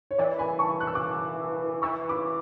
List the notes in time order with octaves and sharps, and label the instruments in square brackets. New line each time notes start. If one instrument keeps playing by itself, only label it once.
[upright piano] C#5
[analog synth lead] E3 [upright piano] D5
[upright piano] G#5 B5
A5 C#6
F#6
E6
D6 F#6
[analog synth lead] E3 [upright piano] C#6 E6
[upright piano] B5 D6